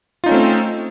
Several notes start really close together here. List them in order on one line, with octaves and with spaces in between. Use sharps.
F4 D#4 C#4 A3 C4